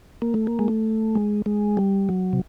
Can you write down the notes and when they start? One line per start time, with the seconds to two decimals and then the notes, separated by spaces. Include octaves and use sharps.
0.22 A#3
0.34 A3
0.47 A#3
0.59 G#3
0.68 A3
1.15 G#3
1.46 G#3
1.77 G3
2.09 F#3
2.33 C3